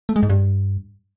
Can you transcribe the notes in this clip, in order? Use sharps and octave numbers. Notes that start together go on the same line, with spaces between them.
A3
G#3
G#2
G2